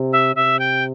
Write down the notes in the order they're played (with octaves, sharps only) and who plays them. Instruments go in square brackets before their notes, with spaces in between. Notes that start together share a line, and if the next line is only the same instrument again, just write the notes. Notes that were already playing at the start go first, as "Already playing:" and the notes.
Already playing: [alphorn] C3
[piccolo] E5
[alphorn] C3 [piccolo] E5
[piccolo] G5